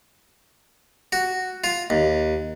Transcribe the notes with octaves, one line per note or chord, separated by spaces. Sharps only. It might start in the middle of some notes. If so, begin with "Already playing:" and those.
F#4
F4
D#2